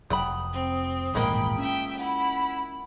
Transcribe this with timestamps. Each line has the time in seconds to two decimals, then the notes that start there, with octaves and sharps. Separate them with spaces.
0.10 F1 F#3 G5 B5 D#6
0.54 C4
1.15 D#1 A1 G#2 F3 G#3 A#3 G5 B5
1.58 C#4 E5 G5
1.98 E4 F#5 B5